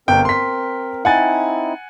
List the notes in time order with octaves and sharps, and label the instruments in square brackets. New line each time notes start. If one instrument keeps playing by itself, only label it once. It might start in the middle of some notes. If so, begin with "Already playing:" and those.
[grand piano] G1 G5 [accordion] C4 A#4
[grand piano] C6 B6
[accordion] C4 D#4 E4 [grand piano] F#5 G#5 A6